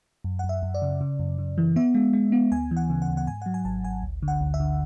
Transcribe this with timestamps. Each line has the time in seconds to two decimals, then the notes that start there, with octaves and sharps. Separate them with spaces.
0.24 F#2
0.39 F#2 F#5
0.49 E5
0.63 F#2
0.74 D5
0.82 C#3
1.01 C#3
1.19 F#2
1.38 C#3
1.58 E3
1.76 B3 E5
1.95 G#3
2.13 G#3
2.32 B3
2.52 D2 G#5
2.71 E3
2.77 F#5
2.90 C#3
3.02 F#5
3.08 D2
3.17 F#5
3.27 G#2 G#5
3.42 F#3 F#5
3.54 G#5
3.65 G#1 A5
3.84 G#1 G#5
4.02 D2
4.23 D3
4.28 F#5
4.41 D2
4.54 E5
4.60 D3